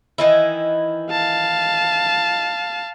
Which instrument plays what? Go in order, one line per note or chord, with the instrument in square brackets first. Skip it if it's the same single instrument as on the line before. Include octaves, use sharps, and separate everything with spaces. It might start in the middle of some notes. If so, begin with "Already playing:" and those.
[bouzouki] D#3 E3 E4
[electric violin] F5 A5